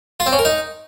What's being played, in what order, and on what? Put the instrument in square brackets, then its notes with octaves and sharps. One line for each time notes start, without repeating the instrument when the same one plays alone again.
[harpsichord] F4
C4
C#4
A#4
D#4